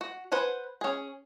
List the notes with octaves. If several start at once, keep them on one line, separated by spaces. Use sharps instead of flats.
F#4
B4 C5 F#5 G#5
C#4 G#4